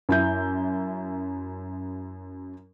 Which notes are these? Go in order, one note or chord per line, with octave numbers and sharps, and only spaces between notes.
F#2 E4 G6